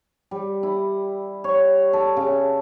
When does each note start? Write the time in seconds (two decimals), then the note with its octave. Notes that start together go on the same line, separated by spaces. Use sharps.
0.31 G3
0.63 E4
1.44 C#5
1.93 A4
2.17 C#3